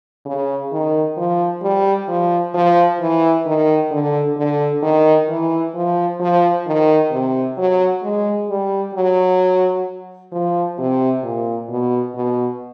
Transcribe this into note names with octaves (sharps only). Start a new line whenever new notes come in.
C#3
D#3
F3
G3
F3
F3
E3
D#3
D3
D3
D#3
E3
F3
F3
D#3
C3
F#3
G#3
G3
F#3
F3
C3
A#2
B2
B2